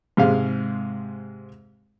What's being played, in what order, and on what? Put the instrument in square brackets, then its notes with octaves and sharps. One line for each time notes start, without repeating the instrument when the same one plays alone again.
[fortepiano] G#2 C3 G#3 F5